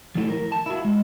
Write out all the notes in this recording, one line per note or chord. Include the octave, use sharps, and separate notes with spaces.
F3 A3 E4 G4
A#4
A5
E4 F#4
G#3